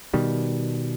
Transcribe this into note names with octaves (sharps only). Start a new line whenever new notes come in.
B2 D#3 G3